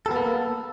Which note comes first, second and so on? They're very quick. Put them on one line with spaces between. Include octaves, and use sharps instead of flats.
A4 B3 A#3